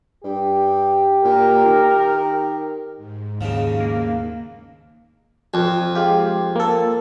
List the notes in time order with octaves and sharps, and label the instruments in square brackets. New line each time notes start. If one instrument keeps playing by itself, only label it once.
[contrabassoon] G2 [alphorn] G4
[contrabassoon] A#2 [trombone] A#4
[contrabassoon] D#3
[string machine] G#2
[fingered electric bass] D#2 [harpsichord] C#3 F3
[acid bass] A#3
[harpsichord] F2
[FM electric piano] G#3 F4 G4
A#3 A4